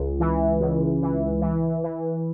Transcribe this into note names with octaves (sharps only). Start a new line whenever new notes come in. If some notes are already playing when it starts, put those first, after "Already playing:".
Already playing: C#2
E3
C#2
E3
E3
E3